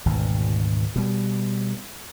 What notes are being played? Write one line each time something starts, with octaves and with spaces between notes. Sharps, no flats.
G#1 D2 B2
B2 G3